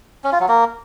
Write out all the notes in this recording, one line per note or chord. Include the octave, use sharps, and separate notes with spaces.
C#4
F4
F#3
A#3